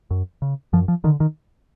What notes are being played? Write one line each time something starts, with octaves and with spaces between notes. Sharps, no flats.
F#2
C#3
F#2 F3
F3
D3 D#3
D#3